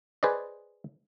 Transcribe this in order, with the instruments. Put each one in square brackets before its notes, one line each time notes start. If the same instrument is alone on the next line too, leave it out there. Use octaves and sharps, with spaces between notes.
[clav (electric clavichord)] G#4 B4 C5 D5 D#5